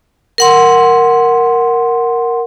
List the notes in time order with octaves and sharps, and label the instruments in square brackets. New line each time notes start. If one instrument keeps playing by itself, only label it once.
[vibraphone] A#4 F#5 C6